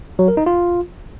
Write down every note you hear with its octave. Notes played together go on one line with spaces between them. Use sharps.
F#3
A#4
D#4
F4